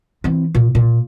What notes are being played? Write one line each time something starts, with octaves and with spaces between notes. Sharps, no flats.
E3 C4
A#2
A#2